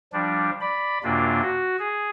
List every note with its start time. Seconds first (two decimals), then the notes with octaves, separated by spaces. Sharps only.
0.13 F3 G3 D4
0.61 D5 B5
1.03 F#2 C3 A#3 D4 F4
1.42 F#4
1.79 G#4